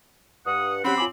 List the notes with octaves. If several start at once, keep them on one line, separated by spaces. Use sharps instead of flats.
G2 F#5 D#6
F#3 C4 C#4 G4 F#5 B5
F4 G#5 D6 F#7